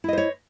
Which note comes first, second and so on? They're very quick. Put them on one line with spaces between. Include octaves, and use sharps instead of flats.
E4 D#5 C5 C#5